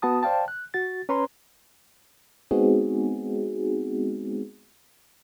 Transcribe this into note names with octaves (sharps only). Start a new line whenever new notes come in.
B3 F#4 A5 D#6
C5 D5 F5 G5 A5
F#6
F#4 A6
C#4 B4 C#5 A#5 C6
G#3 B3 C4 D#4 F#4 G#4